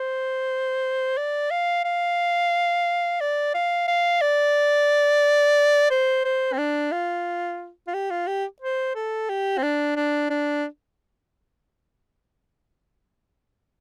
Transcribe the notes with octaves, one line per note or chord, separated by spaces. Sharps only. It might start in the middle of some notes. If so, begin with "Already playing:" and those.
Already playing: C5
D5
F5
F5
D5
F5
F5
D5
C5
C5
C4
D4
F4
F4
G4
F4
G4
C5
A4
G4
C4
D4
D4
D4